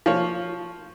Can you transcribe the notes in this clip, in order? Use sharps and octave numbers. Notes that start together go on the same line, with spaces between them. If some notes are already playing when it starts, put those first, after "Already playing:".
F3 A#3 C#5